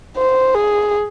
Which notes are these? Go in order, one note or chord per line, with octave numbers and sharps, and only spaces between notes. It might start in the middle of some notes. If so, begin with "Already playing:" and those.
C5
G#4